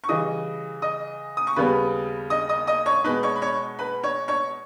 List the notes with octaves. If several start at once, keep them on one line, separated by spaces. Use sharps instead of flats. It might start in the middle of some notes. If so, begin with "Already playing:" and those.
C#6
C#3 E3 G3 D#5 D#6
D#5 D#6
D#6
C#6
D#2 C#3 G3 B3 B4 B5
D#5 D#6
D#5 D#6
D#5 D#6
C#5 C#6
B2 G#3 D#4 B4 B5
C#5 C#6
B5
C#5 C#6
B4 B5
C#5 C#6
C#5 C#6